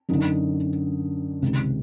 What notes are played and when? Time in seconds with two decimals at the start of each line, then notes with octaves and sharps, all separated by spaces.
0.09 F#2 D3 D#4
1.42 C#2 C3 D#3